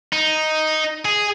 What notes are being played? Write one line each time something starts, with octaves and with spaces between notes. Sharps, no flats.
D#4
G#4